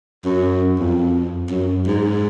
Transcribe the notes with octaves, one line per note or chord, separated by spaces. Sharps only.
F#2
F2
F#2
G#2